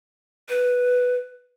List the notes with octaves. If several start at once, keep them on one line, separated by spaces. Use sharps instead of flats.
B4